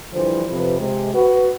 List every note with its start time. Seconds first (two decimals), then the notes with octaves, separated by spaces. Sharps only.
0.13 D3 E3 F3 G3 C5
0.49 F2 C3 F3 B4
0.80 C3 G#3
1.14 F#4 B4